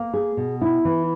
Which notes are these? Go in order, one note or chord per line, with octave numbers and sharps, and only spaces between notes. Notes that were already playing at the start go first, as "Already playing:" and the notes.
Already playing: A#3
G#4
B2
E4
E3